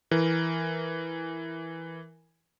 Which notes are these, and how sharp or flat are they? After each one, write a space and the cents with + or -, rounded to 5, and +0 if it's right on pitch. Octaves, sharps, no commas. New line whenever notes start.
E3 +0 A#4 +5